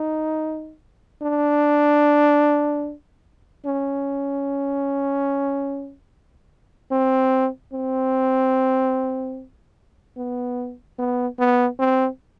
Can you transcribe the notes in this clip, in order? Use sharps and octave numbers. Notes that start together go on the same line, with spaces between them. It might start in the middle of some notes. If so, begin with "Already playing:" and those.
Already playing: D#4
D4
C#4
C4
C4
B3
B3
B3
C4